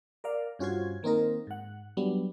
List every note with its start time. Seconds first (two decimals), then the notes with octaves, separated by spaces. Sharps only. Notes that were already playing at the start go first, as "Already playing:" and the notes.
0.24 A#4 D5 F5
0.59 G2 C#4 F4 F#4 C5 G#6
1.03 D#3 A#3 C4 D#4 A#4
1.47 G#2 F#5
1.97 F#3 G3 B3 D4